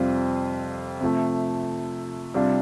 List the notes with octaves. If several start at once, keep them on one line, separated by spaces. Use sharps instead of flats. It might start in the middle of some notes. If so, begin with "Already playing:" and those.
Already playing: F2 C3 G3 C4 F4
C3 F3 A3
C3 G3 D4 F4